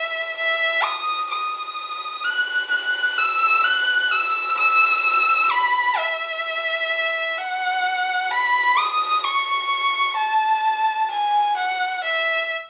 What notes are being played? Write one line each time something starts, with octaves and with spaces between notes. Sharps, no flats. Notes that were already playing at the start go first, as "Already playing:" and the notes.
Already playing: E5
E5
D#6
D#6
F#6
F#6
E6
F#6
E6
E6
B5
E5
F#5
B5
D#6
C#6
A5
G#5
F#5
E5